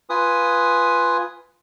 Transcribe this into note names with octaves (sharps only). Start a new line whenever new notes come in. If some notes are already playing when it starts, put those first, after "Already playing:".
F4 B4 G#5 D#6